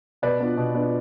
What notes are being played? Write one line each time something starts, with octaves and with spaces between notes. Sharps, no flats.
B2 B4 D5
B3 D4 F4
B2
B3 D4 F4